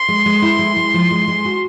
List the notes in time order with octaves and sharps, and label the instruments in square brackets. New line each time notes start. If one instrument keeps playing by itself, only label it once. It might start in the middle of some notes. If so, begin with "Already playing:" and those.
Already playing: [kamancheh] C6
[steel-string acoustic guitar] G#3
G#3
E4
G#3
G#3
F3
G#3
G#3
F#4